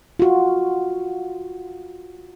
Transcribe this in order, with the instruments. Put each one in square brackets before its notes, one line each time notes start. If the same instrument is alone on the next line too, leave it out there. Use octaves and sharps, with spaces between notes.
[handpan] F4 F#4